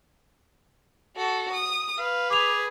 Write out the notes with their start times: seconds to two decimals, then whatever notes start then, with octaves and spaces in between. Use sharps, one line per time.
1.17 F#4 A4
1.53 D#6
1.98 B4 F5
2.30 G#4 D6 F7